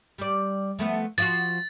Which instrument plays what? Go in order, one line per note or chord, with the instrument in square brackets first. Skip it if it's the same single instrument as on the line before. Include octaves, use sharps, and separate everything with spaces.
[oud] G3 D5
F3 A3 B3
[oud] F3 F4 F#4 [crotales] A6